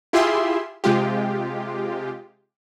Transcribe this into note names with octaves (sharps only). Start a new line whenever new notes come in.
E4 F4 G4 G#4 E5 C6
C3 G#3 F4 G4